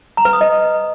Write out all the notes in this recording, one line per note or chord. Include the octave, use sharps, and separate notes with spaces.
A#5
B4
D#6
D#5